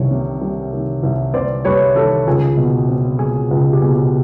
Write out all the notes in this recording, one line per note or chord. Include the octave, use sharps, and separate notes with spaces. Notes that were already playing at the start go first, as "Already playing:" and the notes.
Already playing: C2 C3 D#3 C#5
C3
G3
D#3
C2
C3 C5 D5
G3 B4 C#5
D#3 G4 A4
C#2 G#4
B2
C4
G#3 G#4
C#2
G4
B2 G#4